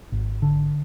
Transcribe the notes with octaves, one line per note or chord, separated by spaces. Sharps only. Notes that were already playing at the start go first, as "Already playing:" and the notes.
G#1
D3